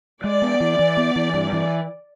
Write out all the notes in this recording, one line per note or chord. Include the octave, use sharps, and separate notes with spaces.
G#3 D5
B3
E3
E3
B3
E3
G2
E3